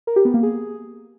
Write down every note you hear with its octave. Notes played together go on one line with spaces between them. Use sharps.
A#4
G4
B3
A#3
G#4